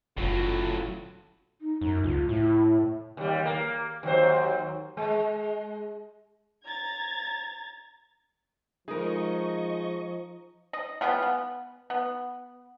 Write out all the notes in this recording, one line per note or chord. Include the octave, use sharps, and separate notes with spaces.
F#1 A2 F#3 A3 C#4 F4
D#4
F#2
C#2 F4
A2 E4
D#2 G3
A#3
D#2 F#3 C5
G#3
A#5 G#6 A6
F3 G#3 D#4 G#4 A#4 D#5 C#6
D#5
G3 G#3 B3 F4
B3
B3